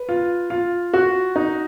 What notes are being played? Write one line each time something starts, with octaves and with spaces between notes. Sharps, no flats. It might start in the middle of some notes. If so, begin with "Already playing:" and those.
Already playing: B4
F4
F4
F#4
D#4